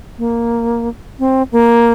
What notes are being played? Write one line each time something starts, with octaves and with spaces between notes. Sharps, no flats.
A#3
C4
A#3